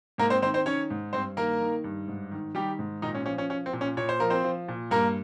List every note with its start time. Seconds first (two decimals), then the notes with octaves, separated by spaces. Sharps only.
0.18 G#2 A#3 A#4
0.30 C4 C5
0.42 D#3 C4 C5
0.54 C4 C5
0.66 D#3 C#4 C#5
0.90 G#2
1.13 G2 C4 C5
1.37 D#3 A#3 A#4
1.61 D#3
1.84 G2
2.08 G#2
2.32 D#3
2.55 D#3 G3 G4
2.79 G#2
3.02 A#2 D#3 D#4
3.15 C#4
3.26 F3 C#4
3.38 C#4
3.50 F3 C#4
3.66 C4
3.73 A#2
3.81 C#4
3.97 A#2 C#5
4.09 C5
4.20 F3 A#4
4.30 C4 C5
4.44 F3
4.68 A#2
4.91 G2 A#3 A#4